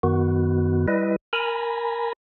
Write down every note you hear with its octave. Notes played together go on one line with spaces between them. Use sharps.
F#2 D#3 B3 F#4
G3 E4 B4 D#5
A#4 G#5 A#5 B5